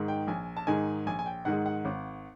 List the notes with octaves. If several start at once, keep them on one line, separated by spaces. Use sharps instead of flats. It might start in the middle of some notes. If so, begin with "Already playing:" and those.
Already playing: G#2 D#3 G#3
G5
A#1 G#5
A5
G#2 D#3 G#3 G#5
A#1 G#5
G#5
G5
G#2 D#3 G#3 F#5
F#5
G#1